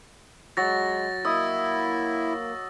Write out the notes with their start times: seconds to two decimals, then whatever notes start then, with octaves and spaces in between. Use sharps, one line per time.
0.57 F#3 G#3 A6 A#6
1.25 A#3 E4 D#5 E6